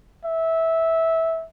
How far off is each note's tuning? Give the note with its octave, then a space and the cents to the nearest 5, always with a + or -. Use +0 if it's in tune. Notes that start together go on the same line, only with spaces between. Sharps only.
E5 -15